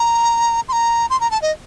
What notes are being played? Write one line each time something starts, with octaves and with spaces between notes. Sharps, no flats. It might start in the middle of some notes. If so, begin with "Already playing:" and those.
Already playing: A#5
C6
A#5
C6
A#5
A5
D#5